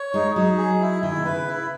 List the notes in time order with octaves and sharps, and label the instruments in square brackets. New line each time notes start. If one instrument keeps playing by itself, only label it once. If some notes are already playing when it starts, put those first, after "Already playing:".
Already playing: [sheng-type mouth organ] C#5
[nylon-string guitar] G#3 [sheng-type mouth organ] D#4
[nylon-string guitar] F#3 [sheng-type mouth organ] D#4
[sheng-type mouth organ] G#4
E4
[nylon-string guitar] D#3 [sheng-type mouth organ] E4
[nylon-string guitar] B2
[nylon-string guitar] C#3 [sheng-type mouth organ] B4
[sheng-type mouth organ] E4